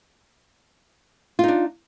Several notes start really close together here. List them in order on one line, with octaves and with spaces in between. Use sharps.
F4 D#4 D4